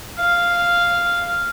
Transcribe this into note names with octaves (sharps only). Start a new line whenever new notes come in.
F5